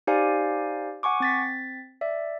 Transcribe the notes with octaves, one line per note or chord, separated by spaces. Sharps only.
D#4 G4 C5 D5 F5 G#5
F#5 G#5 C#6 D6
C4 A6 B6
D5 E5